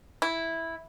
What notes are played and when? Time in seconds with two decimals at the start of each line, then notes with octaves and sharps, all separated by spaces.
0.22 E4